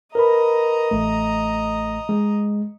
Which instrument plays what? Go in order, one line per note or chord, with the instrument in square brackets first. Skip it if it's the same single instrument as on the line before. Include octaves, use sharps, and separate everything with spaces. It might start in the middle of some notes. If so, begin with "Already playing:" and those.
[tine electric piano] A#4 B4 B5 [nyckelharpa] D#5 A#5
[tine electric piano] A1 A3
G#3